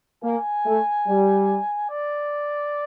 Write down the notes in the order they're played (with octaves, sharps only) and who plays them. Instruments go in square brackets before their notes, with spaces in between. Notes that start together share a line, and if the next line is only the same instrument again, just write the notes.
[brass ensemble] A#3 [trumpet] G#5
[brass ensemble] A3
G3
[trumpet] D5